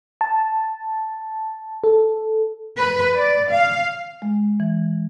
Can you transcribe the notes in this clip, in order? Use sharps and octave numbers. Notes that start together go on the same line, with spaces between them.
A5
A4
B4
D5
F5
G#3
E3